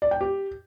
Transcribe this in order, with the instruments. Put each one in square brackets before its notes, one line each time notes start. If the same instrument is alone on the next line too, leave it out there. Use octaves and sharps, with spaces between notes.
[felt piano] D5
G5
G4